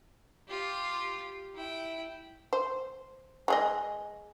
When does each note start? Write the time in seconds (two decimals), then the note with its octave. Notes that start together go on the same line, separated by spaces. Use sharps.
0.48 F4 G4
1.55 E4 G5
2.53 C5
3.48 G#3 G#4 D#5